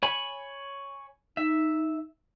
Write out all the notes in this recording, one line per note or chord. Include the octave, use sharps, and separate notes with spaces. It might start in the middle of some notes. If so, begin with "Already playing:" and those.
C#5 G#5 B5
D#4 E5